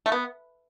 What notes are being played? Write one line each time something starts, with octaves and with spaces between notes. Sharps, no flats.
A3
B3